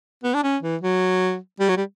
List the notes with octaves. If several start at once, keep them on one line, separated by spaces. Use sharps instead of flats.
B3
D4
C#4
E3
F#3
G3
F#3
G3